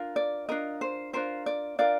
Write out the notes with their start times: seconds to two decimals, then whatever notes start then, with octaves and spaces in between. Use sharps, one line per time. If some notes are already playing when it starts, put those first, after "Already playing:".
Already playing: D4 F4 A#4
0.16 D5
0.49 D4 F4 A#4 D#5
0.81 C5
1.13 D4 F4 A#4 C5
1.46 D5
1.79 D4 F4 A#4 D5